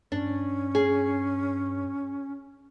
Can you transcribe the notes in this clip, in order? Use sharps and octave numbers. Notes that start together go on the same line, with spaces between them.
G2 C#4 D4
G#4